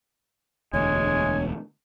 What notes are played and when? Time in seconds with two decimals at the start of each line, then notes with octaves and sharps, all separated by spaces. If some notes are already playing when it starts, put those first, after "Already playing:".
0.73 E1 D2 G#3 C#5 G#5